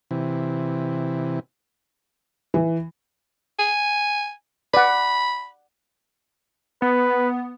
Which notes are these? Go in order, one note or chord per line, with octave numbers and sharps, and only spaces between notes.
C3 E3
E3
G#5
D5 F#5 B5
B3 B4